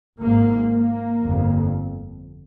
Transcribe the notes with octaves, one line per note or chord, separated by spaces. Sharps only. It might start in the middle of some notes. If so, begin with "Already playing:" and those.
G#1 G#2 A#3
A#3
G1 F2